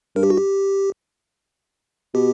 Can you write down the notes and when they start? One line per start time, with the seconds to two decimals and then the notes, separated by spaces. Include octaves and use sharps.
0.16 G2 A#4
0.23 G4
0.30 F#4
0.37 G4
2.14 B2 G4